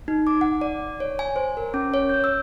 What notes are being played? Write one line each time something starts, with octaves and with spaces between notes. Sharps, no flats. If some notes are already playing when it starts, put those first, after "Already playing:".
D#4
D6
F#5
D5
C#5
G#5
C5
A#4
C#4
C#5
G6
E6